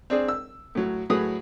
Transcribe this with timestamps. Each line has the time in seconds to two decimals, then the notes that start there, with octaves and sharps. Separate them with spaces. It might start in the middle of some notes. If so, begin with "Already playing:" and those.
0.10 C4 D4 G#4
0.28 E6
0.75 A2 F#3
1.10 A2 F#3 G#4 B4 D#6